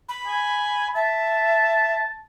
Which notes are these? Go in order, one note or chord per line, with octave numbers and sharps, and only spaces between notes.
B5
G#5
E5 A5